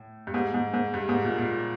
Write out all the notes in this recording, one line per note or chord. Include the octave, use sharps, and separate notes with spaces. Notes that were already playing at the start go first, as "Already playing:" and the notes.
Already playing: A2
G2
G#2
G#2
G#2
G2
G#2
A#2
A#2